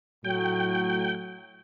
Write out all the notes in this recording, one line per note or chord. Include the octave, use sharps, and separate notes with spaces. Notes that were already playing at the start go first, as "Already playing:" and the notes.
A2 F#3 G5